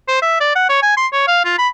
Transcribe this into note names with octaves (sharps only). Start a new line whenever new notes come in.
C5
E5
D5
F#5
C#5
G#5
C6
C#5
F5
F4
B5